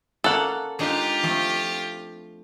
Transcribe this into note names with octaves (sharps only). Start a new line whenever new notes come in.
A#3 C#4 A4 F#5
G#3 D4 D#4 F4 G4
F3 A3 C4